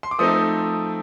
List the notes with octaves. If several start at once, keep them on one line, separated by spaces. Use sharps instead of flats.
C6
D6
F3 A3 C4 D#4 D#6